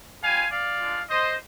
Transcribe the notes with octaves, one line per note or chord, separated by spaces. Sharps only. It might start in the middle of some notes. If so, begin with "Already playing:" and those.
G3 C4 F4 F5 G#5
D5 F5
G#3 D4 F4
C5 D#5